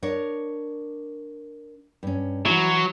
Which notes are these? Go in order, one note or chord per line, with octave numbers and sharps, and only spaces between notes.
D4 A#4 C#5
G2 C#4
E3 F#3 E4